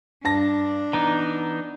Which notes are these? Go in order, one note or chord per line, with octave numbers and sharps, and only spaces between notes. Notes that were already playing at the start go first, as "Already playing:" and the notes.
G2 D4 A5 A#6
E3 B3 D#4 A#5